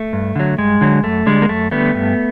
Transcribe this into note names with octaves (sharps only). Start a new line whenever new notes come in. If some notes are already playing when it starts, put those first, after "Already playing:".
Already playing: A3
G2
D3 F#3
G2 G#3
D3 F#3
F#2 A3
D3 G3 G#3
A#3
F#2 A3
D3 G3 A3 B3
G2